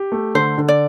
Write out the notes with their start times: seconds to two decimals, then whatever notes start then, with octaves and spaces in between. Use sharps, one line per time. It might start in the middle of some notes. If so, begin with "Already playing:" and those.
Already playing: G4
0.12 A3
0.35 D3 C5
0.58 D3
0.68 D5